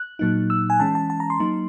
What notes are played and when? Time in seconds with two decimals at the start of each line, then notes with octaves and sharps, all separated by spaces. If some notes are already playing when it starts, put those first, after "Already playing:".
Already playing: F#6
0.19 A#2 F#3 A#3 D#4
0.50 E6
0.70 G#5
0.80 E3 G#3 C#4 A5
0.95 A5
1.10 A5
1.20 A#5
1.30 C6
1.40 F#3 A#3 D#4